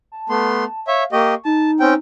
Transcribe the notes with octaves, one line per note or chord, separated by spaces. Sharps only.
A5
A3 B3 C6
C#5 E5 F5
A#3 G4 D#5 C#6
D#4 A5
C4 C#4 G5